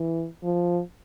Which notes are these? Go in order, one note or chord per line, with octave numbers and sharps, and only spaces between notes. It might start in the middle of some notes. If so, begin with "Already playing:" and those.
Already playing: E3
F3